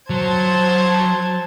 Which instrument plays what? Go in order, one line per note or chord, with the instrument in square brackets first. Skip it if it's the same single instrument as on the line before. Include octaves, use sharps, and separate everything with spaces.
[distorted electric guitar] F#3 [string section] C5 A5 G#6